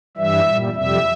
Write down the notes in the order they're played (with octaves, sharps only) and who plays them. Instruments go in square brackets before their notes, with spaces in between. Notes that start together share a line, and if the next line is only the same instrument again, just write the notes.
[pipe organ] G2 E3 G3 E5
A#2 G3
F2 C3 G3 E5